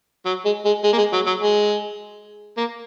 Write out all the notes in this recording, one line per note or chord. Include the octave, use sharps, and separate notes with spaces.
F#3
G#3
G#3
G#3
A#3
G#3
F#3
F#3
G#3
A#3